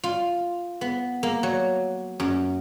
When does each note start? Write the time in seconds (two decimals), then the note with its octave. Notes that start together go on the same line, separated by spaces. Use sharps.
0.04 F4
0.81 B3
1.23 A#3
1.43 F#3
2.20 F#2